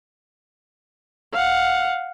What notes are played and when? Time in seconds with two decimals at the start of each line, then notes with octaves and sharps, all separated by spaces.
1.33 F5 F#5